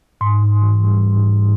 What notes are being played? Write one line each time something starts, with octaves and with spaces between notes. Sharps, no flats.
G#2 C6
G#2
E3
G3
G#2
G#2